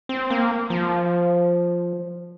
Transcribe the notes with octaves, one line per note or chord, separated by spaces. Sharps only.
C4
A#3
F3